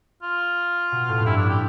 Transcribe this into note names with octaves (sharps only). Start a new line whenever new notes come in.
F4
B2
A2
F2
G2 E4
D4
A2
G4